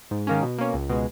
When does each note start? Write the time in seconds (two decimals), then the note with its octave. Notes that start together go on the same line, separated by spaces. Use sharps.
0.11 G#2
0.27 D#3 A#3 C#4
0.42 B2
0.58 A#3 C#4
0.74 C#2
0.89 B2 G#3